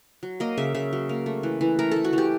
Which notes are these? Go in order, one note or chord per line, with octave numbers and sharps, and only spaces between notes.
F#3
A#3 D#5
C#3 E5
C#3 E5
F#3
A#3
A3
E3
E3
A3 A#4
A3 A4
F#4
E3 G4